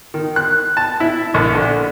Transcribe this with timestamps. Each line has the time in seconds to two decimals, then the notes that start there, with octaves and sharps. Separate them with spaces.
0.14 D#3
0.36 F#6
0.77 A5
1.00 E4
1.34 A#1
1.55 D3